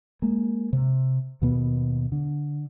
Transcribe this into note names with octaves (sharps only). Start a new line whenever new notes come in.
G#3 A#3
C3
D#2 B2 B3
D3